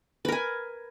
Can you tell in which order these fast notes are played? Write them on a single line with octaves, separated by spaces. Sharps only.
B4 A#4 G#5